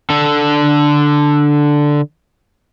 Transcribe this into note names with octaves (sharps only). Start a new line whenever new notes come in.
D3 A4